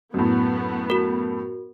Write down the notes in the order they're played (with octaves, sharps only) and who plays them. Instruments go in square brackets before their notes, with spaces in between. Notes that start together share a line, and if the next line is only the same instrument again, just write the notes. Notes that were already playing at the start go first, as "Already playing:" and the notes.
[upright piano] F#2 A2 [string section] B3
[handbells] F#4 A#4